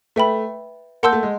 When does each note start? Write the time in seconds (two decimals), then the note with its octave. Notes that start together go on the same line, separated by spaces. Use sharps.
0.16 A3 B4 E5 G5 B5
1.03 A#3 F#5 A5 C6 E6 G6
1.13 A3
1.23 G#3